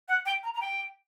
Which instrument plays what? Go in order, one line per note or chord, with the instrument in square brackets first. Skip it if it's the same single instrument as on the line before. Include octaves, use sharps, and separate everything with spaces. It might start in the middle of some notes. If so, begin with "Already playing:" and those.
[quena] F#5
G5
A#5
A#5
G5